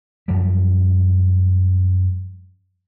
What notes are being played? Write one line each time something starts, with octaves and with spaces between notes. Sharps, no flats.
F#2 F3 G3